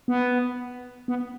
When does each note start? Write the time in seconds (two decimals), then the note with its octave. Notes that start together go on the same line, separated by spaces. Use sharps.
0.08 B3
1.08 B3